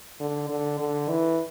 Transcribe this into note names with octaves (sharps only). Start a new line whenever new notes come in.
D3
D3
D3
E3